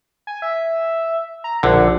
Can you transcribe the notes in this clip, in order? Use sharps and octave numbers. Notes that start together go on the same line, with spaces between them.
G#5
E5
A#5
A#1 D3 F#5